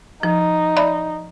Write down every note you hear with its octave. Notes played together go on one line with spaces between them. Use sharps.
F3 D#4
D5 E5 B5